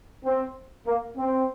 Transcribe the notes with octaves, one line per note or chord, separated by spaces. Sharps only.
C4
A#3
C4